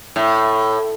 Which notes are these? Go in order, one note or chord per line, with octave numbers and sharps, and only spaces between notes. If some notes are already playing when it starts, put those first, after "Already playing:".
A2